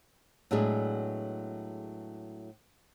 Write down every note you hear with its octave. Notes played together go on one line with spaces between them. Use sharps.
A2 F#3 G#3 B3 D4 G#4